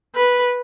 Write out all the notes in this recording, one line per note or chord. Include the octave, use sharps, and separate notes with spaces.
B4